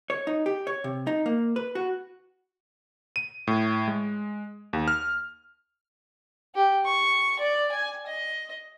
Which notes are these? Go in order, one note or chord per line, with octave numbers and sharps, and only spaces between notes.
C#5
D#4
G4
C#5
C3
D#4
A#3
B4
F#4
D#7
A2
G#3
D#2
F6
G4
C#6
D5
G#5
D#5